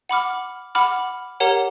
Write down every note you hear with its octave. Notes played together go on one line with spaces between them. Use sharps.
F#5 B5 D6 F6
F#5 B5 D6 F6
G4 A#4 C#5 F#5 A#5